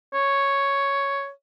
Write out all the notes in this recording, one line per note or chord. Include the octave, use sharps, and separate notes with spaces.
C#5